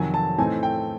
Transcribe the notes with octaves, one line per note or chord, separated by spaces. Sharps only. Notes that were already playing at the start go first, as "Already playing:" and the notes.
Already playing: F2 C3 D#3 F#3 G#5
A5
A2 E3 A3 C4 D#4 G#5
G5